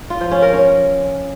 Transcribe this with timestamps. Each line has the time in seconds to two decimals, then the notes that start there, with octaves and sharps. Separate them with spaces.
0.10 F4
0.21 F3
0.31 C#4
0.42 A#4
0.53 C#4